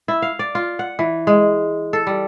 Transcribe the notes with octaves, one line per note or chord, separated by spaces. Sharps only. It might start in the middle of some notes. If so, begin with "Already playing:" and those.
E4
F5
D5
F4
F#5
E3
G#3
A4
G3